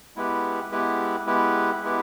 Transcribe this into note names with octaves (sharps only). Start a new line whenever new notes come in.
G#3 B3 E4 G4 B4
G#3 B3 E4 G4 B4
G#3 B3 E4 G4 B4
G#3 B3 E4 G4 B4